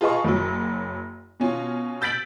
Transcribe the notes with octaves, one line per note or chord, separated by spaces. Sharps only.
F4 G#4 B4 D#5 A5 C#6
F#1 F#3
B2 C#4 F4
E6 G6 A6 B6 D7 F#7